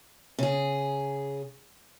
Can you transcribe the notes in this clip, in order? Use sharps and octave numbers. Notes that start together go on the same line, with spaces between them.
C#3 G#4